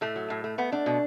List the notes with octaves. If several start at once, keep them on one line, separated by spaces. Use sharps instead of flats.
A2 A3
F#3
A2
A3
A3 B3
A3 D4
B2